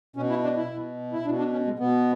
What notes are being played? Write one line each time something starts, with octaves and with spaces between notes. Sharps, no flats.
B2 C#4
E4
D4
E4
B2
E4
B2 D4
D4
C#4
G#3
B2 B3